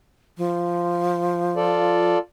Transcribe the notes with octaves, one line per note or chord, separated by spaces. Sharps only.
F3
F4 A4 D5